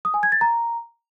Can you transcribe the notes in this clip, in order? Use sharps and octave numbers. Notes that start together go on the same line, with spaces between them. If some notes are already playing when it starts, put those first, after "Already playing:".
D#6
G#5
G#6
A6
A#5